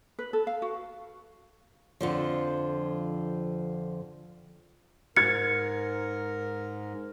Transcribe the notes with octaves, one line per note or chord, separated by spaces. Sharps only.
B4
A4
F5
F#4
F2 D3 F3
G#2 A#4 F6 G#6 A6 C#7